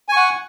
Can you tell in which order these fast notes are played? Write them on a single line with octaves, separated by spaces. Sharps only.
G#5 C#6 F#5